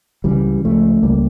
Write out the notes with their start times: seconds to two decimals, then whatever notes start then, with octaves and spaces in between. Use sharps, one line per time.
0.24 C#2 C#3 E3 G3
0.64 C#2 C#3 F3 A3
1.03 C#2 C#3 G3 A#3